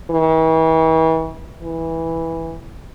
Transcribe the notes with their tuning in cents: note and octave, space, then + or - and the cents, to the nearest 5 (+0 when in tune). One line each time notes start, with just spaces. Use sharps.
E3 -40
E3 -10